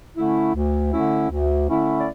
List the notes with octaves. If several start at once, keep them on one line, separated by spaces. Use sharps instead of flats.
D3 A3 C#4 E4
D2
D3 A3 C#4 E4
D2
D3 A3 C#4 E4
D5